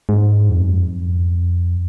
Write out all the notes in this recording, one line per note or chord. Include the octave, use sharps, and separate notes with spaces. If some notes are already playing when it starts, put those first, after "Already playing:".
G#2
F2
F#2
F2